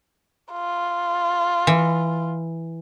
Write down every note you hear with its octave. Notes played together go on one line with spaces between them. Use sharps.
F4
E3